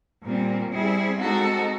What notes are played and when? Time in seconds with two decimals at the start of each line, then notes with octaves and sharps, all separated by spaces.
0.23 A#2 G3 C4
0.71 G3 C4 E4 G#4
1.19 G#3 C4 D#4 F#4 A4